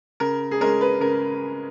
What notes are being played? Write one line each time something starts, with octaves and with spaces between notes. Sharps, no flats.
C#3 A#4
G#4
G#3 C#4 A#4
B4
C#3 A#4